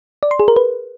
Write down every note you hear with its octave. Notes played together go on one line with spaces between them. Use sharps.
D5
C6
G#4
A#4
B4